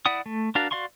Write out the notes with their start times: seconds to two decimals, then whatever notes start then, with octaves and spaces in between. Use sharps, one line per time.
0.06 E4 D5 F#5 D#6
0.26 A3
0.55 D4 F#4 A#4 F5 A5
0.71 F#4 D5 F5 C6 C#6